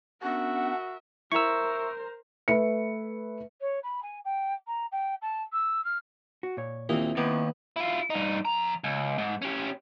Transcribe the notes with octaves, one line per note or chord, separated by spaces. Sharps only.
B3 C#4 D4 F#4 A#4 E5 F#5
E4 A#4 C5 A#5 C#6 E6
A3 B4 E5 C#7
C#5
B5
G#5
G5
A#5
G5
A5
E6
F6
F#4
A#2 C#5
D#2 A#2 C4 D#4 E4
D#2 B3
E4 F4
G2 D#4
F2 A#5
C#2
G#2
C#4 G4